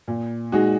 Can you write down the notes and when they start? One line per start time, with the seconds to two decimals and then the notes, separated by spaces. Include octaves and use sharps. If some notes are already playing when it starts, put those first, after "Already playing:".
0.08 A#2
0.52 G#3 D#4 F#4